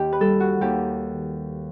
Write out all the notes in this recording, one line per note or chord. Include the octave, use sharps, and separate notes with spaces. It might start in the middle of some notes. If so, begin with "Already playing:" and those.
Already playing: D#2 D#3 G4
B4
G3 A4
F#4
D#2 G4